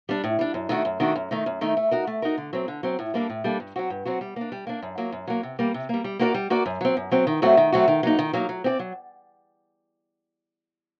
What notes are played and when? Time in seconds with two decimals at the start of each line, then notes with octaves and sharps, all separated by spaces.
0.09 G3 D4
0.24 A2
0.39 G3 D4
0.54 F#2
0.69 D#3 A3 D4 F#4
0.85 F#2
1.00 D#3 A3 D4 F#4
1.16 F#2
1.31 D#3 A3 D#4
1.46 F#2
1.61 D#3 A3 D#4
1.77 A3
1.91 D#4 F#4 A#4
2.07 A3
2.22 D#4 F#4 A#4
2.38 D3
2.53 F#3 C4
2.68 D3
2.83 F#3 C4
2.99 A2
3.14 G3 A#3 D4 A4
3.30 A2
3.44 G3 A#3 D4 A4
3.60 G2
3.76 F#3 C4 F#4
3.90 G2
4.05 F#3 C4 F#4
4.21 G3
4.36 A#3 D4
4.52 G3
4.67 A#3 D4
4.82 F#2
4.98 F#3 A#3
5.12 F#2
5.27 F#3 A#3
5.43 C3
5.59 G3 A#3
5.74 C3
5.89 G3 A#3
6.04 G3
6.19 A#3 F#4 A#4 D5
6.34 G3
6.50 A#3 F#4 A#4 D5
6.66 F#2
6.81 F#3 C4
6.97 F#2
7.11 F#3 C4
7.27 D#3
7.42 F#3 A3 C4 F#4
7.57 D#3
7.72 F#3 A3 C4 F#4
7.88 D#3
8.03 F#3 A#3 D#4
8.19 D#3
8.33 F#3 A#3 D#4
8.49 F#3
8.64 C4 G4 D5
8.79 F#3